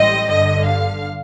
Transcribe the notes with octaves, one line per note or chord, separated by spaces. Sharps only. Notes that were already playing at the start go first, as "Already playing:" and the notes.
Already playing: A1 A2 G3 C4 D#5
G1 G2 D3 D#5
F5